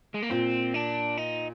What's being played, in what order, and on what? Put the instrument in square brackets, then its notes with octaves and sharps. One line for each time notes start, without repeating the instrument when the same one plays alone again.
[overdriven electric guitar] G#3
A#3
[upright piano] A#2 [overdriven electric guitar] C4
[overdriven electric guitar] D4
D#4